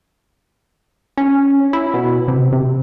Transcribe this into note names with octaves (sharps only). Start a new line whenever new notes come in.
C#4
E4
B2
C3
C3